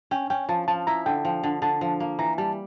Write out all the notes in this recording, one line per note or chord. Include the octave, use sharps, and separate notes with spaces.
C#4 G5
C#4 G5
F3 A5
F3 A5
E4 A#5
D3 G5
F3
D3
D3 A5
F3
A#3
E3 A#5
G3 A5